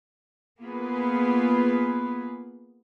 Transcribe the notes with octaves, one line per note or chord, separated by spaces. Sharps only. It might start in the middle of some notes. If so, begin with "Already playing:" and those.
A#3 B3 F4 G#4 B4